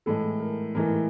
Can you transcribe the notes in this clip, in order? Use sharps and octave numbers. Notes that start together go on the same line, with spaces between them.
A2 E3 G#3 A4
A#4
A2 E3 G#3 A#4